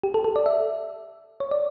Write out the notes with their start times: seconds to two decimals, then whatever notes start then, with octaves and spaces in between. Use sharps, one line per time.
0.03 G4
0.14 A4
0.24 A4
0.36 D5
0.46 E5
1.40 C#5
1.51 D5